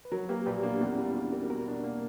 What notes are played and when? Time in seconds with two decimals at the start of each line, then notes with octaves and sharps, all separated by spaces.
0.05 B4
0.12 F#3 F#4 A#4
0.29 A#3 G4 B4
0.46 A#1 G4 B4
0.63 A#3 B3 D4
0.81 E2 C#4 E4
0.98 G3
1.15 E2 D4 F#4
1.32 G3 F#4 A#4
1.50 B2 F#4 A#4
1.68 D4
1.84 A#3